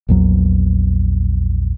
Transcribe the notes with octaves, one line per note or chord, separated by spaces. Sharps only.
A#1 E2 F#3